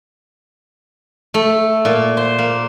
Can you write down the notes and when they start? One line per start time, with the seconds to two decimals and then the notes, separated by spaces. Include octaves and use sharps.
1.34 A3
1.85 A#2
2.17 C5
2.38 A#3